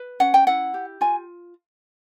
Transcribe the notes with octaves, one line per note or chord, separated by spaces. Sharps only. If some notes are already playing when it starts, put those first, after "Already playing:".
Already playing: B4
C#4 F#5
G5
E4 F#5
G4
F4 G#5